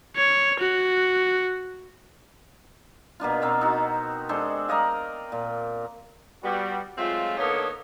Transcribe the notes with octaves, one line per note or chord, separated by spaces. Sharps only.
C#5
F#4
B2 A#3 D4 F4
B2 C4 A#4
D#4 F#4
G#3 D4 A4 C5
A#4 D5 D#5 F5
A#2
G3 B3 F#4
F#3 G#3 A3 C4 F4
D3 A#3 B3 D#4 A4 C#5